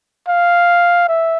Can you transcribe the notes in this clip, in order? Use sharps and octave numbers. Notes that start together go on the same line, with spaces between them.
F5
E5